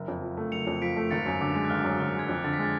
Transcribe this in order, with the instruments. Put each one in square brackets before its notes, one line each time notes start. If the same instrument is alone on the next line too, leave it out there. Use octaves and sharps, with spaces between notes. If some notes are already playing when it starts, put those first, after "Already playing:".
Already playing: [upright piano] F#1
F2
F3
A3
[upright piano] F#1 [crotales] C#7 F7
[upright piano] F2
[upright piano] F3 [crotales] B6 D7
[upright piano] A3
[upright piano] G#1 [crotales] A6 C#7
[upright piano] F#2 [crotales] B6
[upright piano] D3 [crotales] D6
[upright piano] G#3 [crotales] D6
[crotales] F#6
[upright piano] G#1 [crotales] F6
[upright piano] F#2 [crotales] D6
[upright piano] D3 [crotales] F6
[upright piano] G#3 [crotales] G#6
[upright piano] F2 [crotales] F#6
[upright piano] D3 [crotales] A6
[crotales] B6
[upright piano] G#3 [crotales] A6